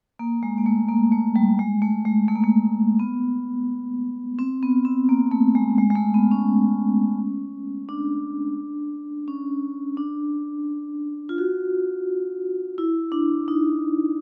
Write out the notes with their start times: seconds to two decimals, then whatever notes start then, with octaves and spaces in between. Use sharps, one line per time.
0.19 A#3
0.43 G#3
0.58 A#3
0.66 A3
0.89 A#3
1.12 A3
1.36 G3
1.59 G#3
1.82 A3
2.05 G#3
2.28 A3
2.36 A#3
2.44 A3
2.99 B3
4.39 C4
4.63 B3
4.85 C4
5.09 A#3
5.32 A3
5.55 G#3
5.78 G#3
5.90 G#3
5.95 A3
6.14 B3
6.31 C#4
7.89 D4
9.28 C#4
9.97 D4
11.29 F4
11.38 F#4
12.78 E4
13.12 D4
13.48 D#4